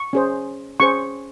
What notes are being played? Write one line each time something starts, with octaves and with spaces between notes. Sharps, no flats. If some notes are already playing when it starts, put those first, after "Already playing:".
Already playing: C#6
C#4 G#4 C5
C#4 G#4 C5 C#6